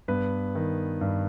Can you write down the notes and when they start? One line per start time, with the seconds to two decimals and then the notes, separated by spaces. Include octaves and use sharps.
0.08 G2 B3 B4
0.55 D#3
1.01 G2